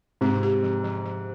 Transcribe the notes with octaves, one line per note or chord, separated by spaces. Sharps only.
G#2 C3 C4
G4
F3
F3
F3